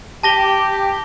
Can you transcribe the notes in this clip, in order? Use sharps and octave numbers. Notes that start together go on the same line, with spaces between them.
G4 A5 A#6 G7